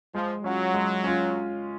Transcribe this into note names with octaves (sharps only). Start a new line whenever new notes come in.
F3 G#3
F#3 C#4 F4
G#3
C#4 F4